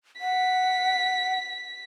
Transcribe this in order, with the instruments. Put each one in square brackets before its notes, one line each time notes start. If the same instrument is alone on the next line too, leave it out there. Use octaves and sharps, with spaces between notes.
[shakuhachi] F#5 [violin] B6